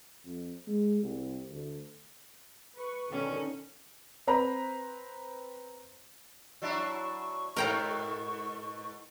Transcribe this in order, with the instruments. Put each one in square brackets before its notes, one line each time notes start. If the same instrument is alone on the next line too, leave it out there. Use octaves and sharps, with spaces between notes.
[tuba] F2
G#3
C2
D2
[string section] B4 C#6
[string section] B2 D3 D#3 [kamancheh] C#4
[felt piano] C4 B4 C5 A#5 B5
[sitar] F#3 D4 E4 [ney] C#6
[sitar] G#2 B2 [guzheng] A#4 G5 A#5